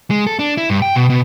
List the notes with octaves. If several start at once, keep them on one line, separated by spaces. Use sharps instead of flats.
G#3
A4
D4
E4
G2
G5
B2
B2